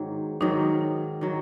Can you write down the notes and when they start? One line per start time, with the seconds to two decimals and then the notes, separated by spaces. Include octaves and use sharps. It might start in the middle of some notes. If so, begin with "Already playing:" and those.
Already playing: G#2 D#3 F#3
0.40 G#2 D#3 F#3 D#4
1.21 D#3 F#3